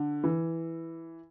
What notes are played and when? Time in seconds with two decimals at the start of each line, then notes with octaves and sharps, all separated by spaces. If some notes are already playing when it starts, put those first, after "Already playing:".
Already playing: D3
0.24 E3